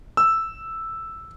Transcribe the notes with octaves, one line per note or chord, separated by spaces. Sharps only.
E6